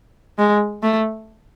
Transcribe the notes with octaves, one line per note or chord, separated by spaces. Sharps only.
G#3
A3